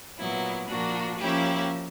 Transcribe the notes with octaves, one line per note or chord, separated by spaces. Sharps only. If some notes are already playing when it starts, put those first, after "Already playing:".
A#2 F#3 B3 E4
A#2 F3 A#3 D4 F#4
F3 A#3 C#4 E4 G4